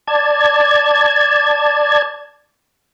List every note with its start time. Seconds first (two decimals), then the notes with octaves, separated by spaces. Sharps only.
0.07 D5 A5 G#6